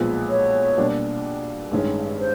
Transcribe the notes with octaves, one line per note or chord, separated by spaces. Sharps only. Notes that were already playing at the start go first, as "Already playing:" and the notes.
Already playing: B1 A#2 F3 G#3 B3
C#5
B2 G3 A#3 D4
A1 G2 D#3 G#3 C#4
C5